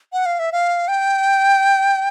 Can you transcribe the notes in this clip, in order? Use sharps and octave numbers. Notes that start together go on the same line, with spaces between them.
F#5
F5
E5
F5
G5